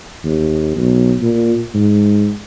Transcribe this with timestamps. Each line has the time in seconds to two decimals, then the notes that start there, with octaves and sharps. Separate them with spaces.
0.24 D#2
0.76 B1
1.21 A#2
1.74 G#2